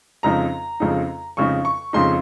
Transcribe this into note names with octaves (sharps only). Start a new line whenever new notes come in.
F2 C#3 G#3 D#4 A#5
F2 C#3 G#3 D#4
F2 C#3 G#3 D#4 C#6
C#6
F2 C#3 G#3 D#4 C6